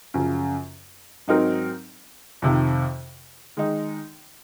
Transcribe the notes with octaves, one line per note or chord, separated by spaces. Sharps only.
F#2 C#3 F3
G#2 F#3 C4 D#4 A#4
F2 C3 D#3
D#3 G#3 D#4